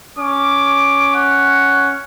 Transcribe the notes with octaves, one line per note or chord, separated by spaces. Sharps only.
C#4 D6
F#5